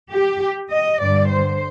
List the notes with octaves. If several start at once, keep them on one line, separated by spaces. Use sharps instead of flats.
G4
D#5
G2 D3 G3 D5
C5